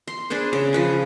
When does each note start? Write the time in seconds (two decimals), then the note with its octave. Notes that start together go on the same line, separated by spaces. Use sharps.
0.07 C6
0.30 D4 G#4 B4 C5
0.53 C#3
0.73 F3 B4 G#5